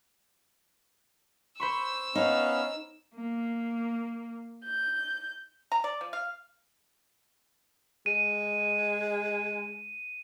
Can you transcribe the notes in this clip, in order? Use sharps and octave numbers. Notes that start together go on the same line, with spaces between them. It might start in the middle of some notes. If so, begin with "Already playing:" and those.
C5 B5 C#6 E6
B3 C#4 D#4 F5
A#3
G6
A#5
D5
F3
F5
G#3 D#7